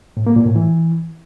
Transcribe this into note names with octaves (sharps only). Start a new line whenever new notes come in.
A2
A#3
A#2
A2
E3